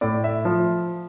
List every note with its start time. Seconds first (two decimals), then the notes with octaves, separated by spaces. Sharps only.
0.01 A2 D5
0.24 E5
0.45 F3